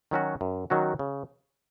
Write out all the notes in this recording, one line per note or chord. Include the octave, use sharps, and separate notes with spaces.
D#3 F#3 C#4 F#4
F#2
D#3 F#3 C#4 F#4
C#3